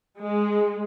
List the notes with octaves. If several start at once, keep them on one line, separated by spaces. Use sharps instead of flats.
G#3